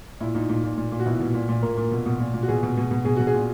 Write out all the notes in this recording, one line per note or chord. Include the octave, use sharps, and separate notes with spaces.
A#2 E4
A#2 D#4
A#2
A#2
A#2
A#2
F#4
B2 E4
B2
A#2
A#2
A#2 A#4
A#2
B2
B2
A#2
A#2
F#4
B2 G#4
B2
B2
B2
B2 G#4
B2 F#4
G#4
A#2